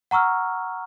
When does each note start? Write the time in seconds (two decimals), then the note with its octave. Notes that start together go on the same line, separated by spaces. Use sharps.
0.11 F#5 A#5 C#6 E6 F6